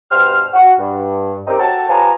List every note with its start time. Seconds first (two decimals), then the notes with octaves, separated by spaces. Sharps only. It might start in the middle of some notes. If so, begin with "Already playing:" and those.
0.11 G2 B2 G4 C5 F6
0.53 F#4
0.79 G2
1.47 C4 D#4 G4 A#4
1.59 F#4 A4 C#5 G5 A5
1.89 F3 F4 G4 B4 G#5 A#5